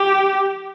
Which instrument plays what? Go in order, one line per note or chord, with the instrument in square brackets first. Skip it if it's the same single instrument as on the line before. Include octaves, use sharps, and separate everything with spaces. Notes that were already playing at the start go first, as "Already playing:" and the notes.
Already playing: [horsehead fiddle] G4